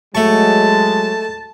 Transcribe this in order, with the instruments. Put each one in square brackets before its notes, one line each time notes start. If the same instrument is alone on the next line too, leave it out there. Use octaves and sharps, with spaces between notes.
[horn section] F#3 G#3 [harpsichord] A3 C#6 [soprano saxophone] A5